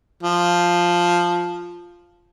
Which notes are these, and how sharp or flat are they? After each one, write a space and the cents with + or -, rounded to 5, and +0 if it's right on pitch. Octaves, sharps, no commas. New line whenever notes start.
F3 +0